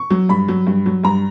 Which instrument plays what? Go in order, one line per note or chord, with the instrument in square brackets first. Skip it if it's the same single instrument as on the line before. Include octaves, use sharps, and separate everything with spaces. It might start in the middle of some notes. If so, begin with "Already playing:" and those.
Already playing: [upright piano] C#6
F#3
G2 B5
F#3
G2
F#3
G2 A#5